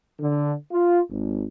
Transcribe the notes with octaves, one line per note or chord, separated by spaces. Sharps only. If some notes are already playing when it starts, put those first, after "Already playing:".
D3
F4
G#1